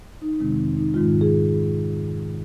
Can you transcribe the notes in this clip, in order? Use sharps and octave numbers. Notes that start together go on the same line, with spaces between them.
D#4
F2 C3 D#3 G#3 C4
C4
D#4
G#2 D#3 G#3 F4
G#4